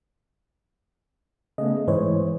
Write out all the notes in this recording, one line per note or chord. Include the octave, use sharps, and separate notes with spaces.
C#3 A3 B3 D#5
G#2 E3 C5 C#5